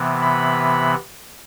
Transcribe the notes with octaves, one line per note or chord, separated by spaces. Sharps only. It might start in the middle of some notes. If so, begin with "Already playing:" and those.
Already playing: C3 E3 B3
B5